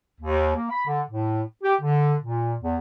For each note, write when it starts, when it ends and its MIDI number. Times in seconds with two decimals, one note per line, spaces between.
0.21 0.54 39
0.56 0.67 58
0.70 0.82 83
0.86 1.01 50
1.09 1.42 45
1.63 1.74 67
1.81 2.14 50
2.23 2.54 46
2.61 2.77 40